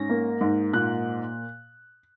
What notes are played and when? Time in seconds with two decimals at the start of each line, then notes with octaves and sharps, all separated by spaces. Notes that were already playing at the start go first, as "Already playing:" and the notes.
Already playing: G#2 C#4 A#6
0.09 A#3
0.41 G#2
0.73 A#2 F#6